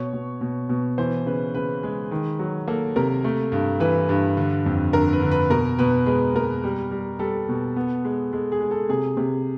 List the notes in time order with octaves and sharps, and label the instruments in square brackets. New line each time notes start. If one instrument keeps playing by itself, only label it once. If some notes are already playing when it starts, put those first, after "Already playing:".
Already playing: [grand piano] B2 C#5
B2
B2
B2
E3 C5
C#3 B4
C#3 B4
G#3
D#3
F#3
A#3 A4
C3 A#4
A3
G2
E3 B4
G2
D3
F2
D3 A#4
B4
D3
B4
B2 A#4
B2 B4
G#3 B4
B2 A#4
G3
G3
G3 A4
B2
B3
G#3
G#3 A4
G#4
G#3
A4
C3 G#4
C3